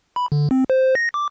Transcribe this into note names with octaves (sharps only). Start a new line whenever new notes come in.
B5
D3
C4
C5
A#6
D6